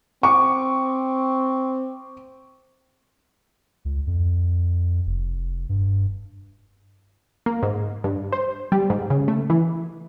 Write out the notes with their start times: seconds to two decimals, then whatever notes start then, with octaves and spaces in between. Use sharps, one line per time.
0.23 C4 C#6 D6
3.85 C#2
4.07 F2
5.06 F1
5.69 G2
7.46 A#3
7.63 G#2
8.04 G2
8.32 C5
8.72 G3
8.90 G#2
9.10 C#3
9.28 A3
9.50 E3